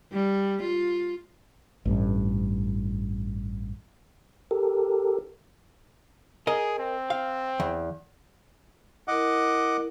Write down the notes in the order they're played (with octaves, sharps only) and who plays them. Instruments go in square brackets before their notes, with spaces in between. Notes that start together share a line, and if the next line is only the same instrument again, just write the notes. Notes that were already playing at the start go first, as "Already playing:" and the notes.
[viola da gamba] G3
F4
[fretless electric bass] A1 G2
[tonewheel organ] G4 A4 A#4
[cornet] G#4 [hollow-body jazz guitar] A#4 D#5
[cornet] C4
[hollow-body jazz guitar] F5
E2
[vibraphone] E4 A#4 [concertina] D#5 F#5 D6